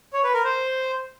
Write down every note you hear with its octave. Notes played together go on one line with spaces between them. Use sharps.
C#5
B4
A#4
C5